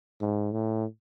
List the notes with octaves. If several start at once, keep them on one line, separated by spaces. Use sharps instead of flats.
G#2
A2